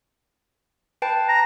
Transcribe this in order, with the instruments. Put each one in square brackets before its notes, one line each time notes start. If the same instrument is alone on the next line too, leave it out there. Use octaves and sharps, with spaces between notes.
[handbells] B4 G5 A5
[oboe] A#5